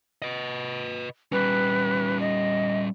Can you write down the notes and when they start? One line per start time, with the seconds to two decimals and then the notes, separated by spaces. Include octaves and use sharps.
0.22 B4 D#5
1.32 G3 C#4 B4
2.20 D#5